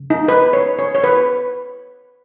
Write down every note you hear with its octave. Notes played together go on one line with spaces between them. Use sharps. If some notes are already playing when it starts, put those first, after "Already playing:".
Already playing: C#3
D#4
B4
C#5
C#5
C#5
B4